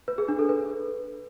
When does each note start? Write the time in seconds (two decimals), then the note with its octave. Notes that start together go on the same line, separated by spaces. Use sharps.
0.08 B4
0.18 G#4
0.28 D4
0.39 A4
0.49 B4